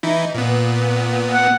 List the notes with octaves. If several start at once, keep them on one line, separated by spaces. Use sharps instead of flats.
E3 D#4 E4
A#2 B3
F#5